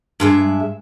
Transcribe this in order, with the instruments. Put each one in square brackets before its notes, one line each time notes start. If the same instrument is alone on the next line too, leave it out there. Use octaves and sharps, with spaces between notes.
[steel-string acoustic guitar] G2 G#3 E5